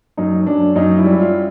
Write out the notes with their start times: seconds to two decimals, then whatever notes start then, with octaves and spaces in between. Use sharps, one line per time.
0.17 F#2 D#4
0.47 F#2 D4
0.76 F#2 D#4
0.98 E4
1.05 G3
1.10 E4
1.20 F4